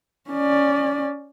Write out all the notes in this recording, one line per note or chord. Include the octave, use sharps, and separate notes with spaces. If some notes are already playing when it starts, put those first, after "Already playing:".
C#4 D5